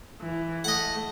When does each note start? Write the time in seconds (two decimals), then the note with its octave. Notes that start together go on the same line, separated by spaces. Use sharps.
0.21 E3
0.64 A3 D#5 F#5